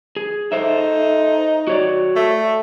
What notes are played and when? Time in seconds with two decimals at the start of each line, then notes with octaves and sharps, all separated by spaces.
0.16 G#4
0.52 D#4 A4 C5 E5
1.67 F#4 C#5 D5
2.16 A3